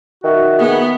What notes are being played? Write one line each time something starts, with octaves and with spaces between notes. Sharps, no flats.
D#3 F#4 E5
B3 G#4